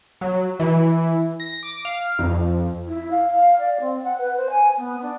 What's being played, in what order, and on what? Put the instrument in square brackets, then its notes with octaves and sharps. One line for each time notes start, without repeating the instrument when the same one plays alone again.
[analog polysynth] F#3
E3
A#6
D6
F5
F2
[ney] E4
F5
F5
D5
C4
F#5
B4
C5
G#5
B3
D4